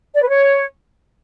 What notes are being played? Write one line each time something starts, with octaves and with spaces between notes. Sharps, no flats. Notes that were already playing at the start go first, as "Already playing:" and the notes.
D5
B4
C#5